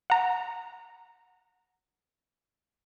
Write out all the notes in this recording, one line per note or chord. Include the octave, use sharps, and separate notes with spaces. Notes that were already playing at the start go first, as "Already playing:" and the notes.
F#5 A#5